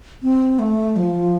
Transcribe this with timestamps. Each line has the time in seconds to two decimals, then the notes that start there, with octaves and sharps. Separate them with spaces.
0.23 C4
0.59 A3
0.96 F3